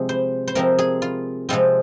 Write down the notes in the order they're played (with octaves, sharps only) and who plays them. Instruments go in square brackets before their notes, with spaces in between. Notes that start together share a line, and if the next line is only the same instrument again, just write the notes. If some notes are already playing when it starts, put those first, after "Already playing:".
Already playing: [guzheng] C3 F3 G#3 C4
C5
C5
C3 F3 G#3 C4 A#4
G#4
F4
C3 F3 G#3 C4 F4